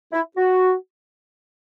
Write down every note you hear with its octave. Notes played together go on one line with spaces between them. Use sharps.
E4
F#4